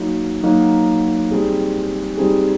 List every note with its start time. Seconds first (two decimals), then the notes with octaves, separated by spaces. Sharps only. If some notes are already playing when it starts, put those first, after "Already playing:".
Already playing: F#3 A#3 D#4 F#4
0.43 F#3 A#3 D#4 F#4
1.31 G3 C4 D#4 G#4
2.17 G3 C4 D#4 G#4